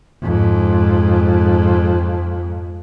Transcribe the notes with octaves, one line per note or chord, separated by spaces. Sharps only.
F2 G#2